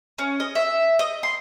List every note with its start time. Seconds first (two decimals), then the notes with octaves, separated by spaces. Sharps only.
0.18 C#4
0.40 D#5
0.55 E5
0.99 D#5
1.23 C6